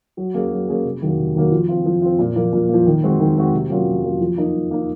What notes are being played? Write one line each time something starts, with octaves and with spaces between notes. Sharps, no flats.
F#3
A#3 C#4 G#4
F#3
A#3 C#4 G#4
C3
D#3 F#3 A#3
C3
D#3 F#3 A#3
F3
C4 F4
F3
C4 F4
A#2
F3 A#3
A#2
F3 A#3
D#3
G#3 C4 F#4
D#3
G#3 C4 F#4
C3
F#3 A#3 C#4 F4
C3
F#3 A#3 C#4 F4
F3
A#3 D#4
F3
A#3 D#4